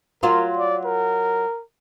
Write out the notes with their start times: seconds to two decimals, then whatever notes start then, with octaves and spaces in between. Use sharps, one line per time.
0.23 F#3 F4 A#4
0.57 D5
0.86 A#4